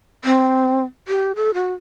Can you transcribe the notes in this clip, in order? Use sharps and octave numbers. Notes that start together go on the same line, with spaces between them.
C4
G4
A4
F#4